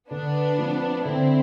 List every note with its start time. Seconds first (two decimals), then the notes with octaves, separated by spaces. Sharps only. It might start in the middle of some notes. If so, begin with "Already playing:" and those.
0.10 D3 B3 D4
0.58 F3 A3 C4
1.05 D3 C4 E4